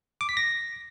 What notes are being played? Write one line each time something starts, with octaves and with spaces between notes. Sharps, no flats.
D6
B6
A#6